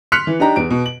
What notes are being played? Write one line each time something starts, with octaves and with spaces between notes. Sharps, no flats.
C6 F6 F#6 B6 C#7 F7
E3
D4 D#4 G4 A#5
E2 D7
B2
F#7